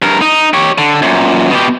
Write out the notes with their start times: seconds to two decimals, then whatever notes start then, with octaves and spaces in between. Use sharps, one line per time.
0.02 G2 A#4
0.21 D#4
0.53 G4 C#5
0.78 D3
1.02 F#2 A#2
1.51 B2 G4